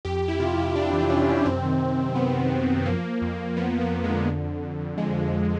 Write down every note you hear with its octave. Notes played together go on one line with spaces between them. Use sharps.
F2 G4
F2
E4
C3 F4
F2 E4
F2 D4
E3
E3 C#4
C3
F#2 C4
D#3
D#3
D#3
F#2 B3
D#3
F#2
F#2
F3 A#3
F3
F2
F2
F3 B3
F3
A#3
F2
G#3
D3
F2
F2
F2
F2
F3 G#3
F2
D3